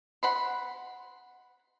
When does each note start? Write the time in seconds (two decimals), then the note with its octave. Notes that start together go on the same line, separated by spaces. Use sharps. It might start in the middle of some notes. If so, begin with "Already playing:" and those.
0.23 F#5 B5 C6